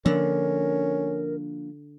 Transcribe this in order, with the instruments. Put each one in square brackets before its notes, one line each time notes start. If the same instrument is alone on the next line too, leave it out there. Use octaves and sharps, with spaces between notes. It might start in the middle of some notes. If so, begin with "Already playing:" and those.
[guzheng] D3 [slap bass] F3 A#3 D4 [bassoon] C#4 [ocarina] A#4